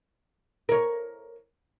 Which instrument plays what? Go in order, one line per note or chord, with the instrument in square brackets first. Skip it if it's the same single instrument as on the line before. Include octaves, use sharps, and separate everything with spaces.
[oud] A#4 C#5